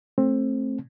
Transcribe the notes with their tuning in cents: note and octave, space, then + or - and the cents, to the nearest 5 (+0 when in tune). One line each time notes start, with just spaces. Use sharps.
A3 +0 C4 +20